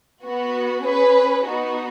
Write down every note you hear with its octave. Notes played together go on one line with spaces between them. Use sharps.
B3 F#4
C#4 G#4 B4
B3 D#4 F#4